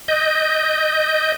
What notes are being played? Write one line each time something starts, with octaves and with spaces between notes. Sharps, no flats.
D#5 G6